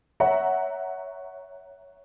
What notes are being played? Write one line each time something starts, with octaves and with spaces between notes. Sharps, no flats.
C#5 E5 F#5 A#5